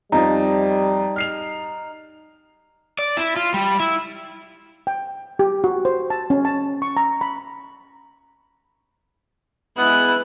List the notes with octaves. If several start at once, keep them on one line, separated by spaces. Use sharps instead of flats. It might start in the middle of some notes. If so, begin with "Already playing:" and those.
F2 F3 G3 D#4
F6 C7 F7
D5
E4
F4
G3
E4
G5
G4
F#4
C5
A5
C#4
A5
C#6
A#5
B5
G#3 B3 E4 F#6